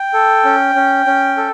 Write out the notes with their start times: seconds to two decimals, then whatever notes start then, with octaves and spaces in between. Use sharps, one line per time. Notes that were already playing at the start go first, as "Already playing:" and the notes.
Already playing: G5
0.13 A4
0.45 C#4
0.75 C#4
1.06 C#4
1.37 A4